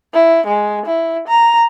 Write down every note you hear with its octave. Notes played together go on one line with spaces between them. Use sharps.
E4
G#3
E4
A#5